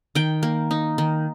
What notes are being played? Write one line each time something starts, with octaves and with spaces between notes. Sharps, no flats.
D#3 G5
A#3
D#4
D#3